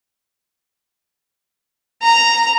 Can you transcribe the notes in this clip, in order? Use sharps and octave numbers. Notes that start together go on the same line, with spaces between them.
A#5